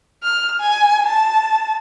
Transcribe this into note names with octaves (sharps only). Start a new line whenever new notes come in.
F6
G#5
A5